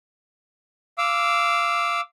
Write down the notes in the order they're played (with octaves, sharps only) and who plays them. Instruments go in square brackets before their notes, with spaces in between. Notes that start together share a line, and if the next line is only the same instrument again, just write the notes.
[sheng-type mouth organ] F5 D6 E6